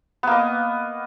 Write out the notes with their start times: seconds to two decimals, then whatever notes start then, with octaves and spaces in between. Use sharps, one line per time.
0.23 B3
0.27 A#3
0.31 D#5